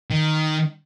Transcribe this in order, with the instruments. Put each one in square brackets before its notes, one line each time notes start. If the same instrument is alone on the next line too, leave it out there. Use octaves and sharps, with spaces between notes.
[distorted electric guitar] D#3